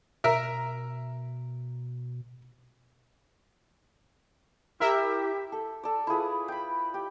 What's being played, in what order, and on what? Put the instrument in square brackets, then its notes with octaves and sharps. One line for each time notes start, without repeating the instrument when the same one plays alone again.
[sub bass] B2 [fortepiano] A#4 E5
[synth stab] E4 A#4 E5 [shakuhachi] G4
[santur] A4
A4 D5
E4 F4 G#4 B4
G5 B5
G4